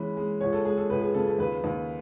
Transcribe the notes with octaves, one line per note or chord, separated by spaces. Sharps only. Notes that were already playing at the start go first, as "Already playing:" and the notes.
Already playing: E3 G#3 C#4 B5
G#3
C#2 C#5
A4
G#3 G#4
A4
C#2 B4
G#4
C#3 A4
A4
D#2 B4
D#2